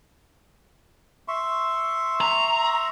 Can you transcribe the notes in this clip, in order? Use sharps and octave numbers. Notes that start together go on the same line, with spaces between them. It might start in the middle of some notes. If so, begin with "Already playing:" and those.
E5 C6 C#6
A#5